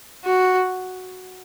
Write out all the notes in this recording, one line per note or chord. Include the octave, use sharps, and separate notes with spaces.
F#4